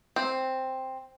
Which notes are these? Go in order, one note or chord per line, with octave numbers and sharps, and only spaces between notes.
C4